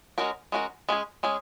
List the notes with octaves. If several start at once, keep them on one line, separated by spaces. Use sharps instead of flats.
G#3 C#4 F#4 A#4
G#3 C#4 F#4 A#4
G#3 C#4 G#4
G#3 C#4 G#4